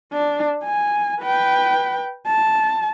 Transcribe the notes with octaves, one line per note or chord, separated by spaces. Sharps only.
D4
G#5
B4 G5
A5